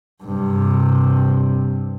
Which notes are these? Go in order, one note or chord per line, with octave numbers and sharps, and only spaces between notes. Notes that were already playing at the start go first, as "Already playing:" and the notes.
G2 C3